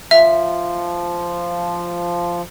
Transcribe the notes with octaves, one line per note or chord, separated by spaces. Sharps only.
F3 E5